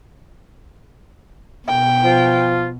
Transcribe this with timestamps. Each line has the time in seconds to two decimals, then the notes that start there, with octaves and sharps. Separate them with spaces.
1.68 B2 G5
2.04 F3 F4